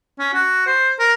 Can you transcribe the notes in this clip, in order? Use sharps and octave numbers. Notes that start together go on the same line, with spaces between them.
C#4
F#4
C5
A#4